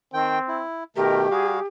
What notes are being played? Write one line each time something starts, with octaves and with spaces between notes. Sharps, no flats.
D#3 C4 G5
E4
B2 D#3 A3 G4 A#4
G3 F#4 G#4 F5